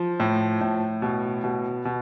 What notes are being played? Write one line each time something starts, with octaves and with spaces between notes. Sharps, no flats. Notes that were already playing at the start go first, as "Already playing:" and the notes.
Already playing: F3
A2
A2
B2
B2
B2